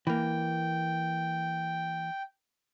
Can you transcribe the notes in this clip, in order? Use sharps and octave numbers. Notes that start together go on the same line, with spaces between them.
E3 A#3 G5